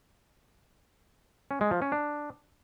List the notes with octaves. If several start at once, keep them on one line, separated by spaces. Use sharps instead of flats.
C#4
G#3
F3
C#4
D4